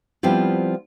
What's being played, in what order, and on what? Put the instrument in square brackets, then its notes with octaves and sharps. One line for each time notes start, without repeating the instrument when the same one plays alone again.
[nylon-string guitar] F3 G3 B3 C4 E4 F4